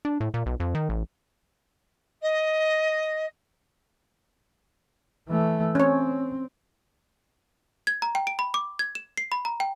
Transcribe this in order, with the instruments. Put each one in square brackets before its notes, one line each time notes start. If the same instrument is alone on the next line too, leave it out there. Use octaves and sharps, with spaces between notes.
[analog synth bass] D4
A2
A#2
B1
F2
D#3
A1
[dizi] D#5
[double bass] E3 A3
[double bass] C4 [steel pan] C#4 C#5
[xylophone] G#6
A#5
G5
D7
B5
D6
G#6
E7
C7
B5
A#5
G5